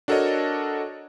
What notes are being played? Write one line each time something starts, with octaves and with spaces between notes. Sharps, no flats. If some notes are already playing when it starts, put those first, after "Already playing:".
D4 F#4 A4 A#4 C#5 D#5